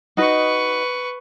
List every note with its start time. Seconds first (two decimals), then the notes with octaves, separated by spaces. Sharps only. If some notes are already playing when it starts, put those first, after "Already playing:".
0.17 D#4 F#4 B4 D#5 C#6